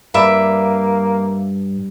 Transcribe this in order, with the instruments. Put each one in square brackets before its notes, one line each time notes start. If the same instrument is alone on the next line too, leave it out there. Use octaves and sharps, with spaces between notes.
[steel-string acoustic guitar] G2 [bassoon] A#3 [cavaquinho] D5 E5 B5